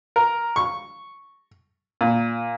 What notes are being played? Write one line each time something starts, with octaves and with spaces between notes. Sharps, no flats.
A#4
C#6
A#2